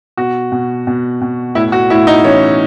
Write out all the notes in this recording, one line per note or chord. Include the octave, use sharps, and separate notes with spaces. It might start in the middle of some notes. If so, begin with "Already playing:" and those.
B2 F#4
B2
B2
B2
A2 E4
F#4
A2 E4
D#4
E3 C#4